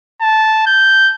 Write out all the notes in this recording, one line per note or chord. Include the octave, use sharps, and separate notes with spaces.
A5
G6